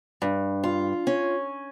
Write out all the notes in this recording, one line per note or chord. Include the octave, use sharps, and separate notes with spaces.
G2
F4
C#4